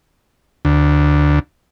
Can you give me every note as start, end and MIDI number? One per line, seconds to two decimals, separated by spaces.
0.65 1.39 38